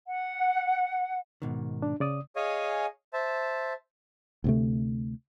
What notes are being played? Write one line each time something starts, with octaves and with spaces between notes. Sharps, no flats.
F#5
G#2 B2 D#3
D4
C#3 D5 D#6
G#4 C#5 D#5 F5 G#5
C5 E5 A5
D2 C3 A3